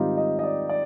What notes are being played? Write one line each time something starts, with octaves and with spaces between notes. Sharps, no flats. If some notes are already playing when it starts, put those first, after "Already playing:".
Already playing: G#2 D#3 G3 C4 D#4 F4 G4
D#5
D#5
D5
D5